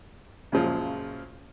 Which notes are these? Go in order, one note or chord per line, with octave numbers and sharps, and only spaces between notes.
F#2 A#2 C#3 F3 G#3